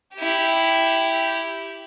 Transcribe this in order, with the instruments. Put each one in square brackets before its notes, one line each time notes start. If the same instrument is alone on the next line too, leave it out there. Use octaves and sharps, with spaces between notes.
[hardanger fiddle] E4 G4